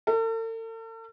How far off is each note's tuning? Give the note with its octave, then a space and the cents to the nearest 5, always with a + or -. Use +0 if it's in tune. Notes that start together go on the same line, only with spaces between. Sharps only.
A4 +45